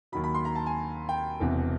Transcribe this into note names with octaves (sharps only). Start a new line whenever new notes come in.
D#2 D#3 F#3 B5
B5
C6
A#5
A5
G#5
G5
E1 E2 C3 E3